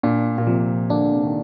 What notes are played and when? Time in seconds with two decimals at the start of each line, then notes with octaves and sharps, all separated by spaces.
0.03 A#2 D4
0.38 A#2
0.47 C3 F3
0.90 A#2 D3 D4
1.12 C3
1.25 D#3